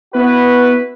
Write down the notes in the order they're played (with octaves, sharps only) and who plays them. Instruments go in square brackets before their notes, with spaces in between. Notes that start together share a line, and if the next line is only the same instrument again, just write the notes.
[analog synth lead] B3 [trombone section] E4 F#4 B4